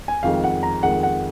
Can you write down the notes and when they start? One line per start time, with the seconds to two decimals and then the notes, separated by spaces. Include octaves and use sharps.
0.08 G#5
0.23 F2 D#3 G#3 F5
0.44 F#5
0.63 A#5
0.83 F2 D#3 G#3 F#5
1.03 F#5